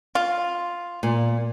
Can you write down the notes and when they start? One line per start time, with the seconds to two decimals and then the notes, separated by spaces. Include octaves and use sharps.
0.15 F4
1.03 A#2